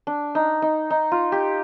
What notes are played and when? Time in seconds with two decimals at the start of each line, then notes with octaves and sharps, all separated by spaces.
0.07 D4
0.35 D#4
0.62 D#4
0.90 D#4
1.12 F4
1.32 G4